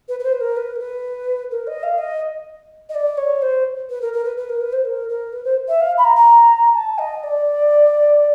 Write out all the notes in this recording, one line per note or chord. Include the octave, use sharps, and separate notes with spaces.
B4
B4
C5
B4
A#4
B4
A#4
B4
A#4
D#5
F5
D#5
D#5
D5
C#5
C5
B4
A#4
A#4
B4
B4
A#4
B4
C5
A#4
A#4
B4
C5
E5
F5
B5
A#5
A#5
A5
D#5
D5